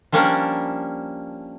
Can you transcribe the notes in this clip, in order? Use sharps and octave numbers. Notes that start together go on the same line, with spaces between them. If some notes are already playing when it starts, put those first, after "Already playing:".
F3 G3 A#3 C#4 D4 A#4